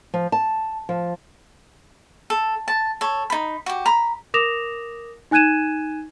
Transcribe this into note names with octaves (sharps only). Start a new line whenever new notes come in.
F3
A5
F3
A4
A5
A4 C#5
D#4 B5
F#4 G4
A#5 B5
A#4 D6 D#6 A#6 E7 F7
D#4 G#5 F#6 G#6 D#7 E7